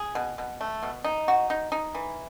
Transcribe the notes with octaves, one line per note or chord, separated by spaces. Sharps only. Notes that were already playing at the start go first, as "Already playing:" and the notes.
Already playing: G#4
B2
B2
A3
B2
D#4
F#4
D#4
D#4
E3